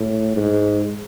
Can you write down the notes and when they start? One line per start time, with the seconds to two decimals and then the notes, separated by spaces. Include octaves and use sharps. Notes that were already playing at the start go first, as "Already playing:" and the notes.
Already playing: A2
0.36 G#2